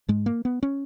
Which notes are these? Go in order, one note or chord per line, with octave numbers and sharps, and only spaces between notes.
G#2 G#3
A#3
B3
C#4